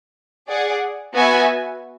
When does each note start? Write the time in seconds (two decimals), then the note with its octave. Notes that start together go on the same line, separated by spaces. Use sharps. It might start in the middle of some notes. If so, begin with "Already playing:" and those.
0.48 G#4 D5 F#5
1.14 B3 F#4 B4 E5 G#5